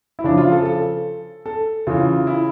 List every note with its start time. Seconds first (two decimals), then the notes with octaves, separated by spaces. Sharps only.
0.19 E4
0.24 C#3 F3 D4
0.38 F4
0.52 A4
0.65 A4
1.46 A4
1.87 C#3 E3 F4
2.27 E4